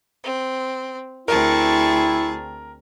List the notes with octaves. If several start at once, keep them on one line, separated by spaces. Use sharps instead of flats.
C4
D2 C4 E4 G#4 A#4 A5 C#6